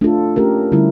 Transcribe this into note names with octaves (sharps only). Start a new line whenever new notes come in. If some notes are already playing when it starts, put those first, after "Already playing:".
A3 D4 F4 A4
A3 C#4 G4 A#4
D3 G3 C#4 E4